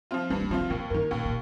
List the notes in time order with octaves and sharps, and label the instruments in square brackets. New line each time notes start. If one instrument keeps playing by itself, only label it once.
[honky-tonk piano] F3 C4 F4
[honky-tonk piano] G2 [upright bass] C#4
[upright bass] A#3
[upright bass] D#3 [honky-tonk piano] F3 C4 F4
[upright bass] C#3
[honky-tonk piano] D#2 [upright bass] C3
[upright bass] G2 [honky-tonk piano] A#3
[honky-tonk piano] D#3
[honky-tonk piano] D#2 [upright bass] A#2
[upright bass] A#2